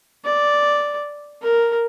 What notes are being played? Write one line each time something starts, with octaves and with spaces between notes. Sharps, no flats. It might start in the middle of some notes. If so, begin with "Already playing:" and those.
D5
A#4